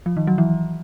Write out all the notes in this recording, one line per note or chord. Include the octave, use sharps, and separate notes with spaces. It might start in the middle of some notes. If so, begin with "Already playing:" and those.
F3
D#3
F#3
E3